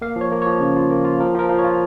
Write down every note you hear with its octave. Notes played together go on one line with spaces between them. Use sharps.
A#3 F5
F3
C#5
A#3
F3 C#5
C#3
F4
A#3
F4
F3 A#4
F3 A#4
F3
C#5
F4